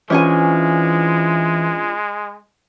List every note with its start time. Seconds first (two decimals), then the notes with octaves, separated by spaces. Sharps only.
0.10 E3 G#3 C#4 D4 F4 C5 C#5 G#5